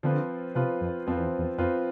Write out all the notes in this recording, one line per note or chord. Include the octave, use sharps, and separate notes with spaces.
D3 F3 C4 F4 B4
C3 F3 C4 F4 B4
F2
F2 F3 C4 F4 B4
E2
E2
F2 F3 C4 F4 B4